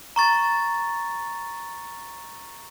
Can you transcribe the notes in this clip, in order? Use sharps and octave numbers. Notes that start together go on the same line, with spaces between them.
A#5 C#6 A6